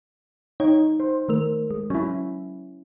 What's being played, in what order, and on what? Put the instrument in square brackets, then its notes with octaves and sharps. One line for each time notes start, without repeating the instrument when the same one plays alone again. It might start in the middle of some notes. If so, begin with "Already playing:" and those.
[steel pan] D#4 [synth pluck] C#5
[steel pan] C5
[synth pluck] D#3 A3 A#4
G#3
[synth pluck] F#3 [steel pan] C#4 E4